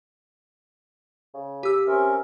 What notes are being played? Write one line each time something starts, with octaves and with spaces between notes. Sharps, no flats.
C#3
G4 E6
C3 C#4 A#4